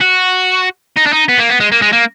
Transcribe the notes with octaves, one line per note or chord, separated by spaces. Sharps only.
F#4
D#4
D4
D#4
B3
A#3
B3
G#3
A#3
G#3
A#3